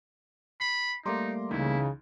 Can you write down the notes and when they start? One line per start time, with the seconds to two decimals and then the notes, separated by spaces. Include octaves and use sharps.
0.61 B5 C7
1.06 G3 A3 A#3 D#4 A#5 C6 D6
1.51 C#2 C#3 E3 D#4 E4